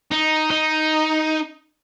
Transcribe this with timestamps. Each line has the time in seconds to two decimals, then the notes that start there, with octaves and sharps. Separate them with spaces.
0.11 D#4
0.50 D#4